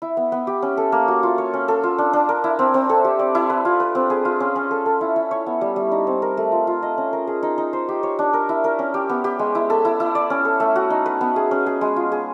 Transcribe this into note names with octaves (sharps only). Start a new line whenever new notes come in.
E4
B3
B3
G4
C#4
A4
A#3
F#4
F4
C#5
C#4
A4
F4
D4
D4
A#4
E4
C4
C4
A4
G4
D5
E4
B4
F4
B4
C4
G#4
F4
C#4
C#4
A4
A4
E4
E4
C#5
B3
G3
G3
D#4
C4
A#4
A3
F4
F4
D#5
C#4
A#4
G#4
D#4
D#4
C5
G4
C#5
D4
A#4
E4
A#4
C#4
G4
B3
G4
G#3
E4
A4
E4
E4
D5
C#4
A4
A3
F#4
D#4
B4
B3
G#4
C#4
G#4
G#3
F4
G#4